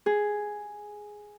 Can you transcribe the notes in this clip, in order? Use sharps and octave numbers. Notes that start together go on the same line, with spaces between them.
G#4